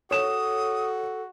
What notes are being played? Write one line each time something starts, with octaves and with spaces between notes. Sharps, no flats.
F#4 A4 C#5 D#6 E7